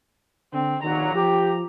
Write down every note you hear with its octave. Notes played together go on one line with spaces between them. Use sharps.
D3 C4
A#1 A#2 D#3 F#3 A#5
F3 G4